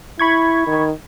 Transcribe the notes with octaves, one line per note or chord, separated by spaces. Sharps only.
E4 B5 C#6 G#6
D#3